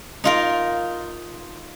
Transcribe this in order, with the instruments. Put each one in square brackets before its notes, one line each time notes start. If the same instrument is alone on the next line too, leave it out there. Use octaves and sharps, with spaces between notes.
[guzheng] D#4 F4 A#4